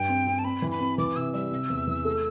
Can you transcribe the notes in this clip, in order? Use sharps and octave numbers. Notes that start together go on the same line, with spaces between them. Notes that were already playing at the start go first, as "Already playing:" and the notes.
Already playing: G2 G5
C4
C4
A5
C4 B5
E3
B5
C4
E3 D6
C3 E6
G3 E6
C3
E2
E3
A3